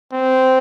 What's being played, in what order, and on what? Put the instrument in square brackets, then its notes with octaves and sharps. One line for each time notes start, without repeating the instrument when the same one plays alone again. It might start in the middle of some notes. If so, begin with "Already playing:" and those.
[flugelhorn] C4